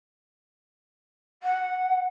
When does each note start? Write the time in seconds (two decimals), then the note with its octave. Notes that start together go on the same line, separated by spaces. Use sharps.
1.43 F#5